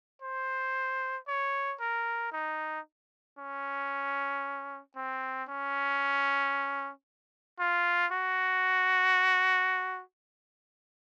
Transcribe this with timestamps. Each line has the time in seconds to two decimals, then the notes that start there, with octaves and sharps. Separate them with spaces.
0.22 C5
1.28 C#5
1.80 A#4
2.33 D#4
3.38 C#4
4.96 C4
5.49 C#4
7.59 F4
8.12 F#4